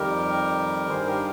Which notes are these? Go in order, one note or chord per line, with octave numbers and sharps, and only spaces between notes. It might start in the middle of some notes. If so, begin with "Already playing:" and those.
Already playing: F2 D#3 G3 G4 A#4
G2 D#3 G3 G#4 C5
G4 A#4